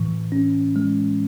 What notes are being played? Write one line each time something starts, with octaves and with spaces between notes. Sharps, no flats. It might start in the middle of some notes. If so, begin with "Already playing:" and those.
Already playing: A2 E3
C#4
G#3